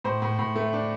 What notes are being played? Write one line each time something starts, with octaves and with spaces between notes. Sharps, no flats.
A2 C5
A2
A2
A3
D4